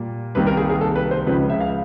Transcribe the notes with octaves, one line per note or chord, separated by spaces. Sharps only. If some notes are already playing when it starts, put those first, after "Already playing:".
Already playing: A#2 G3 A#3
C2 C3 D#3 G3 A#3 B4
A#4
G#4
G#4
A4
B4
C5
C#2 C#3 F3 B4
E5
F5